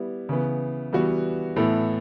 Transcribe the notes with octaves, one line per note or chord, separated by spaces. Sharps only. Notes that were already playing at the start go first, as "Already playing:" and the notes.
Already playing: G3 B3 E4
C#3 E3 B3
E3 G3 B3 F#4
A2 E3 B3 E4 A4